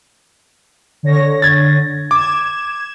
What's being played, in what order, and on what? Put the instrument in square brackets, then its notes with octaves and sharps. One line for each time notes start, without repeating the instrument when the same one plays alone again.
[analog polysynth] D3 C#5 A#6
[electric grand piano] G#6 A6
[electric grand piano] D6 [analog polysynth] G#6 E7